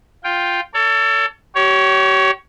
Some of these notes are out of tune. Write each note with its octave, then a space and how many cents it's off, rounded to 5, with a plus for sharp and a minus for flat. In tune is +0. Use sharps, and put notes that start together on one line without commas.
F4 +5 G5 +0
A4 +25 C#5 +45
G4 -35 C#5 +10